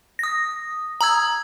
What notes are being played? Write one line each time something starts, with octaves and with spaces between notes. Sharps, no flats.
D#6 A#6
A#5 D#6 E6 G#6